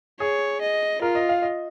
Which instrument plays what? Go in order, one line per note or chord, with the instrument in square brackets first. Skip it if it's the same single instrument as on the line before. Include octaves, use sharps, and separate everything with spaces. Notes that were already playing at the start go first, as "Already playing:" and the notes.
[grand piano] G#4 [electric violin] C#5
[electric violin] D#5
[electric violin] F4 [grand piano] A#4
[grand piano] D#5
F5
D#5